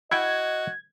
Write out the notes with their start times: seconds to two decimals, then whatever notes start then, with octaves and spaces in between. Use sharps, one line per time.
0.11 E4 F#4 D#5 F#5 G5 G#6